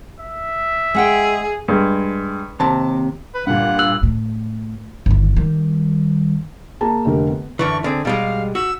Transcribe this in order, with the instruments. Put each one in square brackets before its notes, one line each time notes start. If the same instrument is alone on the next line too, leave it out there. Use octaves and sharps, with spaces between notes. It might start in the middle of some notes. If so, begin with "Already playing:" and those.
[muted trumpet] E5
[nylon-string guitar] G#3 F#5 G5 [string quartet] G#4
[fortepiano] G2 G#3
[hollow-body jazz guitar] D#2 C3 [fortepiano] C4 A5
[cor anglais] B4
[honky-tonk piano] G2 A#2 [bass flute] F5 [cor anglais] F#5
[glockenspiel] E6 F#6 F#7
[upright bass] A2
G1 D#3
D#3 G3
[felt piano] A#3 G#4 A5 A#5
F1 D3 G4 A#4
B3
[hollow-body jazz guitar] F#2 D3 E3 [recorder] C#6
[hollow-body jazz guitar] D3 C4 [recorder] G#4
[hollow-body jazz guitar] B2 G3 G#3 [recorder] F5
[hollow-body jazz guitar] F#4 [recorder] E6